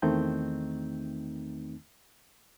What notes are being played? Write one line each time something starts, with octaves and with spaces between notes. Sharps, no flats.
E2 D#3 A3 C4 D#4 G6